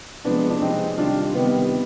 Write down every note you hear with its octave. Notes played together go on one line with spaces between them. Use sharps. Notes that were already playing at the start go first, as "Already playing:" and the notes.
C3 F3 G#3 B3 D4
D4
C3 F3 G#3 C4 D#4
C3 D#3 G3 D4 F4
C3 D#3 G3 B3